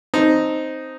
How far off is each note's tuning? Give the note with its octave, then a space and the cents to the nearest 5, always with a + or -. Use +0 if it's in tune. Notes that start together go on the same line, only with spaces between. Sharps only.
C4 +0 D#4 +0 A5 +0